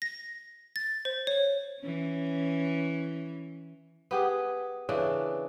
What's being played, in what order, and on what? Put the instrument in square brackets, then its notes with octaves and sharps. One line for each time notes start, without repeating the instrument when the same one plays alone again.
[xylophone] A#6
A6
C5
C#5
[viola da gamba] E3 C#4
[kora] B3 G4 G#4
C#3 E3 D4